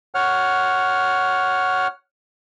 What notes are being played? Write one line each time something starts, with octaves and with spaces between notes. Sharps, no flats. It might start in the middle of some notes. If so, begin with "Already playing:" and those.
C#5 F#5 F6